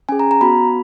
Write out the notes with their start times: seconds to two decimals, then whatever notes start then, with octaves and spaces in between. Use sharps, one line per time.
0.09 C#4 G#4 G#5
0.19 A#5
0.31 A#5
0.41 B3 F#4 B5